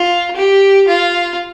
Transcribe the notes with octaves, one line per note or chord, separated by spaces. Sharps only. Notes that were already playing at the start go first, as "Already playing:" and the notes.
Already playing: F4
G4
F4